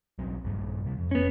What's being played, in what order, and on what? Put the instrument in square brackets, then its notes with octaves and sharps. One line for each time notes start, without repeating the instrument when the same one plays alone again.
[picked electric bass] B1 F#3 C4
A#1 G2 A#2
C3 G3
F2
[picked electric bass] F1 [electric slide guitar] B3 C#4